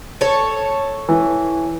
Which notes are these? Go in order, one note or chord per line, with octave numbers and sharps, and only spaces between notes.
A4 C#5
E3